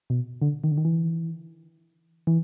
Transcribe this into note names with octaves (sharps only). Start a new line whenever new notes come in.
B2
D3
D#3
D3
D#3
E3
E3